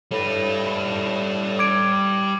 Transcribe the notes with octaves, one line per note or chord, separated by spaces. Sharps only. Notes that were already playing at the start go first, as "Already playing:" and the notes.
A2 G3 B4
D6 G#6 D7